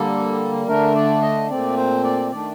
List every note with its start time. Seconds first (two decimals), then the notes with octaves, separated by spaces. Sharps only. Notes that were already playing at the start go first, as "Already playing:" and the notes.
Already playing: D3 G3 A#3 A4
0.68 D3 A3 D4 A#4
0.95 D5
1.22 D#5
1.50 A#2 A3 C4 D5
1.77 C5
2.04 D5
2.31 D#3 A3 D4 D5